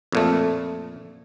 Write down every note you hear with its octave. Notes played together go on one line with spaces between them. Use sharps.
F2 A#2 A3